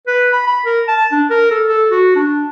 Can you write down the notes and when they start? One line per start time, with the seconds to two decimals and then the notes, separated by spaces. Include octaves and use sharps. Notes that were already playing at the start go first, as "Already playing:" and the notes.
0.07 B4
0.33 B5
0.47 B5
0.65 A#4
0.88 A5
1.12 D4
1.30 A#4
1.51 A4
1.68 A4
1.91 F#4
2.15 D4